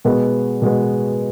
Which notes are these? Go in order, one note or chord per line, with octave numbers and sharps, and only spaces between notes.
B2 G#3 B3
B2 G#3 B3